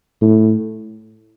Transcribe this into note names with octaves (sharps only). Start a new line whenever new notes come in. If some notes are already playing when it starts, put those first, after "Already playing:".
A2